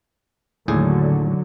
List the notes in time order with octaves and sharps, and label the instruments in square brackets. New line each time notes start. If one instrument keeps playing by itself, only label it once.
[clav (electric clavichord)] D#2 A2 G#4 [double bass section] D3 F#3